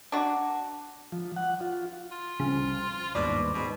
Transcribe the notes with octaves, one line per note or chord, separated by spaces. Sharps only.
D4 F#4
F3
F#5
F4
F4
C2 C#3 F3 C4
G1 D#2 G#2 B2 D4 D5
G#2 B2 G#3 C4